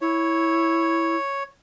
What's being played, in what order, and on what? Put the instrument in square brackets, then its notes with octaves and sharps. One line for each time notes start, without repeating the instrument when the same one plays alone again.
[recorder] E4 [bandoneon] C#5